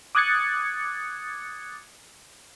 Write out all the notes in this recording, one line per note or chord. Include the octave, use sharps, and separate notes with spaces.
D6 D#6 F#6 G#6 A6 C#7